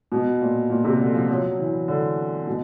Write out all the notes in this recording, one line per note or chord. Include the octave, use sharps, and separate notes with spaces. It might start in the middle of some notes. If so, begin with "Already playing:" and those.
B2
A#2
A#2
C3
D3
F3
F#3
E3
D3
B2